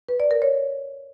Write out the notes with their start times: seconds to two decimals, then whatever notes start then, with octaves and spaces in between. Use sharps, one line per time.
0.09 B4
0.20 D5
0.31 A#4
0.42 C#5